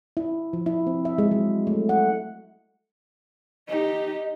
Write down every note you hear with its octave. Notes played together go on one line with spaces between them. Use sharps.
E4
F3
E4
C4
E5
G#3
F#3
A3
F#5
D#4 G4 D#5